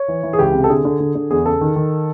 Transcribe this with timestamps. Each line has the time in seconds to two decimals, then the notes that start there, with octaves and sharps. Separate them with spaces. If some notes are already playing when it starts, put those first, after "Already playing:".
Already playing: C#5
0.08 E3
0.23 E3
0.33 G#4
0.39 C#2 G4
0.54 C3
0.64 A4
0.69 D3 G#4
0.85 D3
1.00 D3
1.15 D3
1.30 E2 G#4
1.46 C#3 A4
1.61 D#3
1.76 D#3